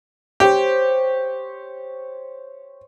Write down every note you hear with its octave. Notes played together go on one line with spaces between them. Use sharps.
G4 C5 C#5